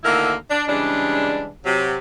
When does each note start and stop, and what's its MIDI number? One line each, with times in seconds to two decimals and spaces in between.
0.04 0.34 38
0.04 0.34 50
0.04 0.34 51
0.04 0.34 58
0.04 0.34 64
0.04 0.34 70
0.51 0.64 62
0.68 1.49 49
0.68 1.49 52
0.68 1.49 55
0.68 1.49 56
0.68 1.49 62
1.65 1.96 48
1.65 1.96 54